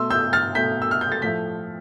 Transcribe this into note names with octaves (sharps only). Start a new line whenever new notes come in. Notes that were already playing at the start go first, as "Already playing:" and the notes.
Already playing: B2 A3 C6 E6
E6 G6
F6 A6
B2 A3 G6 B6
E6
F6
G6
A6
A2 F3 A3 G6 B6